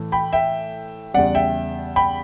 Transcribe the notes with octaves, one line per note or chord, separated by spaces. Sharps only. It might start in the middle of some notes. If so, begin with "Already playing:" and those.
Already playing: A2 E3 A3
G5 B5
E5 G5
E2 C#3 G3 D5 F#5
E5 G5
G5 B5